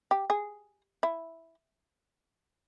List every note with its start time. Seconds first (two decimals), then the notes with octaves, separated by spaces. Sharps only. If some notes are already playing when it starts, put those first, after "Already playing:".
0.11 G4
0.30 G#4
1.03 E4